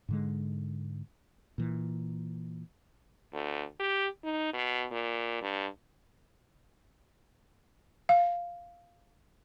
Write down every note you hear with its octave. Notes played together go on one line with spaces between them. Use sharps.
G#2 D3 G#3
A#2 E3
D2
G4
D#4
B2
A#2
G2
F5